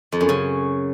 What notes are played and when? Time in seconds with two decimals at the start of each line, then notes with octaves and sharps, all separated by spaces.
0.12 F2
0.21 F#2
0.29 C#3